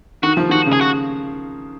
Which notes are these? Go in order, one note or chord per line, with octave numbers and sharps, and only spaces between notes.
D#3 F#4
F3
D#3 F#4
C#3
G#4
F#4